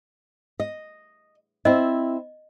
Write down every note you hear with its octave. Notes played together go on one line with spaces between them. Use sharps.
D#5
C4 E4 D#5